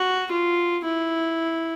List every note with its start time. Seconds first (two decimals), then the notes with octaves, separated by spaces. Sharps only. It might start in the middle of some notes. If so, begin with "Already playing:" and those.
Already playing: F#4
0.31 F4
0.84 E4